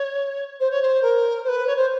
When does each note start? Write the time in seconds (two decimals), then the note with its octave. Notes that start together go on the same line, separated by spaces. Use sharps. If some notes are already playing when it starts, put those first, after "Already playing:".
Already playing: C#5
0.59 C5
0.70 C#5
0.82 C5
1.02 A#4
1.43 C5
1.48 B4
1.66 C#5
1.76 C5